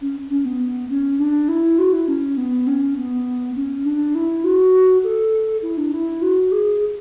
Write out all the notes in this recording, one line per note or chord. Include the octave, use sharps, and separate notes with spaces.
C#4
C#4
B3
C#4
D4
E4
F#4
E4
C#4
B3
C#4
B3
C#4
D4
E4
F#4
A4
E4
D4
E4
F#4
G#4